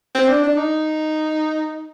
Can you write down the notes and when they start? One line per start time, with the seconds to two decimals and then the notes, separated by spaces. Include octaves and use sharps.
0.15 C4
0.29 D4
0.43 D4
0.57 D#4